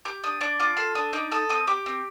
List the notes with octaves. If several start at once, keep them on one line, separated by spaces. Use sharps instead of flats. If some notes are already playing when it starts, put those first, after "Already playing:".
G4 D6
D4 D#6
D4 D6
F4 D6
A4 C6
D4 D#6
D#4 D6
A4 D#6
C4 D#6
G4 D6
C4